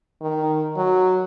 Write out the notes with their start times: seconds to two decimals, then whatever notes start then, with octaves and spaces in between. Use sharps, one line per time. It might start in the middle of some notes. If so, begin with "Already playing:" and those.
0.21 D#3
0.77 F#3